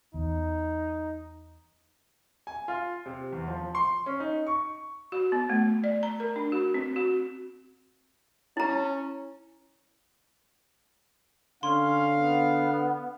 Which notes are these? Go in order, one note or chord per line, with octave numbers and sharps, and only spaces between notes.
E2 D#4
G#5
F4
C3
E2
F3
C6
C#4
D#4
C#6
F#4
B3
A3
D5
A#5
A#4
D4
F#4
C4
F#4
C#4 E4 A#5
D3 C#4 F5 C6
B3